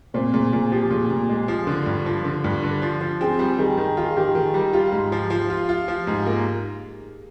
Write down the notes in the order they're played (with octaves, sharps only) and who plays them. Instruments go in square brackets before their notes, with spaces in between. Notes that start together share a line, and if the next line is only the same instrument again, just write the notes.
[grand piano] A#2 [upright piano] C4 C5
[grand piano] A#2 [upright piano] G#4
[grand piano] A#2 [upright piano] G#4
[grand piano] F3 [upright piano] G4
[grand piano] A#2 [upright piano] G#4
[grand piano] A#2
G#3
F3
D3
G2
F3
D3
G2
D3
F3
F3
[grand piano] C4 [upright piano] G#4
[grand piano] G3
[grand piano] D#3 [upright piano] G#4
[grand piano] D#3 [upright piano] G#4
[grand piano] F4 [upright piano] G#4
[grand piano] D#3 [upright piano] G4
[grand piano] D#3 [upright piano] G#4
[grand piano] G3
[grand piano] F4 [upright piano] G4
[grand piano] G#2
F3
F3
F4
F4
F3
G#2
[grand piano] A#3 [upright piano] G#4